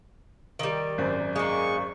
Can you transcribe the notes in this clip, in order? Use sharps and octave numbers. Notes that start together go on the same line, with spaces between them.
D#3 G3
G#1 F#2 C5 D5
G#3 A#3 C#6